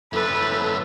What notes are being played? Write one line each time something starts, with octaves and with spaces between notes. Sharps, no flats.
F#2 E4 A4 B4